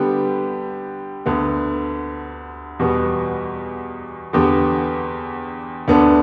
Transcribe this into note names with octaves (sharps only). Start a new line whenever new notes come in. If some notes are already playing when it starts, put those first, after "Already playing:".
Already playing: D3 G3 B3 G4
D2 D3 B3
E2 B2 G3 B3
E2 D3 B3 G4
D2 D3 B3 D4